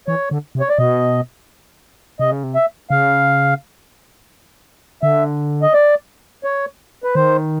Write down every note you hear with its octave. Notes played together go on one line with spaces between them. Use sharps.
E3 C#5
D3
C3
C#5
D5
B2 D#5
C3 D#5
C#3
C3
E5
C#3 F5
D3 E5
D#5
D5
C#5
B4
D#3 C5